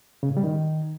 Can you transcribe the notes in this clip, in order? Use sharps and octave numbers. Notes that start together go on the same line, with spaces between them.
C#3
A2
G3
D#3